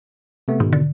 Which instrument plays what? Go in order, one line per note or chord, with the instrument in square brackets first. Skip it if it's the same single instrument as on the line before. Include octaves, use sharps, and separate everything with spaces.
[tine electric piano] C3 A3 B3
[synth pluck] G#2 [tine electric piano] B2 D#3
[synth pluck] D3